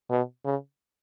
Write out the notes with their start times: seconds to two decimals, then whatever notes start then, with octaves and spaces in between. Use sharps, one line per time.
0.10 B2
0.45 C#3